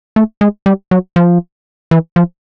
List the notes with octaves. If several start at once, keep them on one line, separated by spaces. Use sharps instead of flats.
A3
G#3
G3
F#3
F3
E3
F3